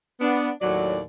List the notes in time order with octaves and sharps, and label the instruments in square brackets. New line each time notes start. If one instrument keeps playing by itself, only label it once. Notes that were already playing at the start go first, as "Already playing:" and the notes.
[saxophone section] B3 [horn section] D4
[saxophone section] D#2 A2 D5 [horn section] F#3